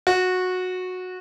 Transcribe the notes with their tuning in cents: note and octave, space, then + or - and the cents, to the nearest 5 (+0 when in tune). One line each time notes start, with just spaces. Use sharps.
F#4 -15